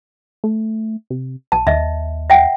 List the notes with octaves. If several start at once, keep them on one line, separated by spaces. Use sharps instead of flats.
A3
C3
B1 A5
D#2 D#5 E5
E5 F#5 G5